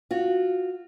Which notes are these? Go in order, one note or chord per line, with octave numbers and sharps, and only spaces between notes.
F4 F#4